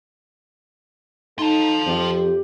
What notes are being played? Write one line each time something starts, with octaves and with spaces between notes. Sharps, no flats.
D#4 F4 A4 A5
F2 C4 G4